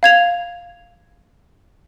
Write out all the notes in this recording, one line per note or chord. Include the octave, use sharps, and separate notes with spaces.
F5 G#6 F7